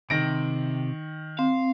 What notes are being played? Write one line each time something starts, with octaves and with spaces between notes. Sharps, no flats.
C3 D#3 A#6 D7
C4 F5